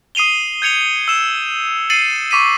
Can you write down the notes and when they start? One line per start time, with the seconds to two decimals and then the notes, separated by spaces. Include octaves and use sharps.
0.15 D#6 C7 D#7 F7 G7
0.62 G6 G#6 C#7 F7 G7
1.08 E6 E7
1.90 A6 C7 C#7 D#7 F#7
2.31 C#6 D6 B6 D#7